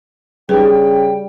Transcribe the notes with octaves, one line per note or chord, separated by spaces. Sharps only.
C#3 G3 D4 D#4 G#4 B4 G5
G5